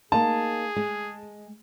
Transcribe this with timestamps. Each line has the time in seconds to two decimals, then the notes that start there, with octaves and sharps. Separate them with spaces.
0.12 A#3 D#4 G#4 A5
0.76 G#3